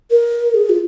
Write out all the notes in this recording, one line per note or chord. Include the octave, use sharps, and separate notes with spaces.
A#4
G#4
F4